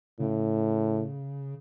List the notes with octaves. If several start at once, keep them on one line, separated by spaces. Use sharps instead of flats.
A2 C#3